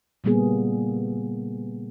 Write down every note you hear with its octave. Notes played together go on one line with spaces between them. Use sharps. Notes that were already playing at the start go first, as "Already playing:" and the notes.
A#2 C#3 G3 A#3 B3 G#4